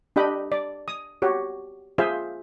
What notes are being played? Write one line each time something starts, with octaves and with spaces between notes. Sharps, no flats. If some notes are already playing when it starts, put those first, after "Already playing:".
D4 G4 D#5 G5 B5
D5
D#6
F#4 G4 C#5
F4 G#4 C5 E5 F5